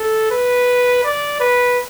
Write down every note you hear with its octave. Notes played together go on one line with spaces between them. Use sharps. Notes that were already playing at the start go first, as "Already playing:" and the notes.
Already playing: A4
B4
D5
B4